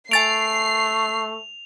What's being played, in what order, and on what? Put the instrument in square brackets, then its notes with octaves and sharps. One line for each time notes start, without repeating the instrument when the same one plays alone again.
[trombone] A3 [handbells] G#5 A6 D7 [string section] C7 [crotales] F7